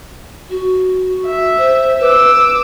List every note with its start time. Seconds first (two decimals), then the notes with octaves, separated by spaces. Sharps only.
0.50 F#4
1.27 E5
1.58 C5
2.00 B4 D6 E6